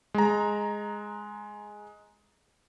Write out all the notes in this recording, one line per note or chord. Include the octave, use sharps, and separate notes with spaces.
G#3 A#5